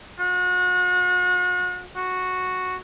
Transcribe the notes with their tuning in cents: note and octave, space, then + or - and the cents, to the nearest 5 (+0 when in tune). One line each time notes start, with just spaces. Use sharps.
F#4 -40
F#4 -5